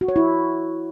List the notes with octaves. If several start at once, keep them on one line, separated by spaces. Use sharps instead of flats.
F#4
C#5
E4